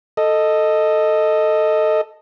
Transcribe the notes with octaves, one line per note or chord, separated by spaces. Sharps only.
A4 D#5